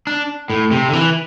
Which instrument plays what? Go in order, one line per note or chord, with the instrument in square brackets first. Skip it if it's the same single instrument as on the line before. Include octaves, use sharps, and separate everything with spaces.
[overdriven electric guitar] D4
A2
C3
D3
E3